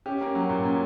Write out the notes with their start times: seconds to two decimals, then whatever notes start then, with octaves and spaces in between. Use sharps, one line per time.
0.06 C#4 G4
0.21 A#3
0.35 F#3
0.49 A#2
0.64 C#4